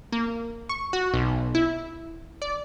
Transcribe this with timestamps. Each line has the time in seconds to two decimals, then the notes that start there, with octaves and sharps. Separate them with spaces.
0.12 A#3
0.69 C#6
0.93 F#4
1.14 B1
1.55 E4
2.42 D5